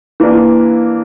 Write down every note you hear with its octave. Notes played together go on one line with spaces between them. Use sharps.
E3 A#3 D4